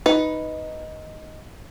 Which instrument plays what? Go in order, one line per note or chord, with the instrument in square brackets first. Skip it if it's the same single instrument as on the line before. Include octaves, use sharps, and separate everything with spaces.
[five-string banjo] D#4 B4